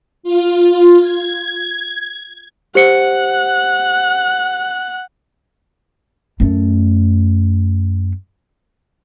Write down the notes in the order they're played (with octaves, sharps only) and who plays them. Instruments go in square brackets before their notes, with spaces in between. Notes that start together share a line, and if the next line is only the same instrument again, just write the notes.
[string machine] F4
G#6
[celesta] G4 C5 C#7 [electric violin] F#5 F#6
[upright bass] F#2 A3